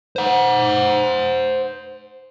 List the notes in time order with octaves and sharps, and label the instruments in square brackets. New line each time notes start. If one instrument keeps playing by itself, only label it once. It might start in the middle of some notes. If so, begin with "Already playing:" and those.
[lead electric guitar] C5 F#5